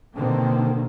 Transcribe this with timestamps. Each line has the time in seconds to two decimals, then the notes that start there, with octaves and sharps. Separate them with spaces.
0.16 B2 D3 D#3 A#3 C4